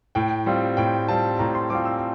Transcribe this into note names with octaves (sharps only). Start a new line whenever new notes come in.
A2 G5
G3 C4 F4
A2 G5
G3 C4 F4 A5
A2 A#5
C6
G3 C4 F4 D6
E6